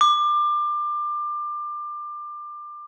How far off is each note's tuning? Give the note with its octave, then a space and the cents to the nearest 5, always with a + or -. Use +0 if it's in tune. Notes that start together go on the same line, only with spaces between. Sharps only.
D6 +25